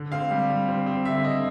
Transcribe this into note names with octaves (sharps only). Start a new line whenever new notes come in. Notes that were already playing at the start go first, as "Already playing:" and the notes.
Already playing: D3
C4 F5
G3
G3
C4
C4
D3 E5
D3 D#5